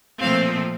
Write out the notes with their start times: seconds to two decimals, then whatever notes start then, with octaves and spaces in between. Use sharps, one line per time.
0.21 A#2 F3 A3 C4 F5